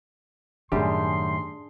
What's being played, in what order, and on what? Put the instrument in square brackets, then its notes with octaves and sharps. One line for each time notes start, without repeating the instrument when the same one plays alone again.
[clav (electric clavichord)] F#2 G3 G4 [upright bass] A2 D#3 [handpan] D4 G#4 [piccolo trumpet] C6